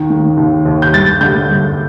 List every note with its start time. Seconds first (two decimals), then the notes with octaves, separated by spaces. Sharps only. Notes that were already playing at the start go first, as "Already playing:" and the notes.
Already playing: D#2 D#3
0.10 D#3
0.37 D#2
0.66 D#2
0.82 G6
0.93 G2 A6
1.21 D3 G6
1.48 G2